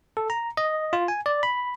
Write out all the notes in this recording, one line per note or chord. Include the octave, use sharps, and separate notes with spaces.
A4
A#5
D#5
F4
G#5
D5
B5